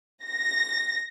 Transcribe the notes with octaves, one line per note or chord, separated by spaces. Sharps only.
A#6